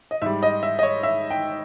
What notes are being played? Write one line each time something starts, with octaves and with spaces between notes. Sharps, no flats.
D#5
G#2 G3 E5
D#5
E5
D#5
C#5
E5
G5